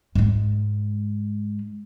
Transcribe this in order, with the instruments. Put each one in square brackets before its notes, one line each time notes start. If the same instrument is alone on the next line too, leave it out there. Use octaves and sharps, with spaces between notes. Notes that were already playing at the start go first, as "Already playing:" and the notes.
[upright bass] G#2 G#3